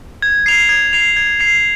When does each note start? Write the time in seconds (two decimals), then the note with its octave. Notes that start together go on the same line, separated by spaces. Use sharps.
0.22 G#6
0.46 C7 F7
0.69 G#6
0.93 C7 F7
1.16 G#6
1.40 C7 F7